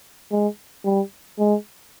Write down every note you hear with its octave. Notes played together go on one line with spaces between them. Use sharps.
G#3
G3
G#3